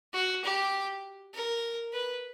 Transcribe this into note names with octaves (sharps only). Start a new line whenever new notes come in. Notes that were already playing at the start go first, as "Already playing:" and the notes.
F#4
G4
A#4
B4